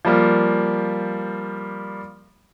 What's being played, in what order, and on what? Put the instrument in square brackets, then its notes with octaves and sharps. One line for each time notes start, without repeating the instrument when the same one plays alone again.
[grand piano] F3 G3 A#3